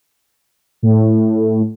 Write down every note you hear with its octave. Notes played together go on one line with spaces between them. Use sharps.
A2